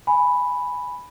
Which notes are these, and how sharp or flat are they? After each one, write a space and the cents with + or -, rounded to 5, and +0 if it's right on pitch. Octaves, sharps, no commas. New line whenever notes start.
G#5 +0 B5 +0